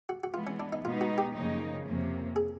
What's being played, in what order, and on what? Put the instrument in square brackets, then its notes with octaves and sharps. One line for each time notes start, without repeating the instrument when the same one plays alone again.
[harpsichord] F#4
F#4
[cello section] E3 G#3 B3 [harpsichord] F4
[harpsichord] C#4
D4
D#4
[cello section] B2 G#3 B3 D#4 [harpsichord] F4
[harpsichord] F#4
G4
[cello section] F#2 C#3 F3 A#3 D#4
F2 C3 F3 A#3 C#4
[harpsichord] G#4